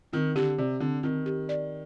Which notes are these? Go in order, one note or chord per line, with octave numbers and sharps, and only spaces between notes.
D#3 C4
D3 G4
C3 D5
D3 C4
D#3 C4
G4
D5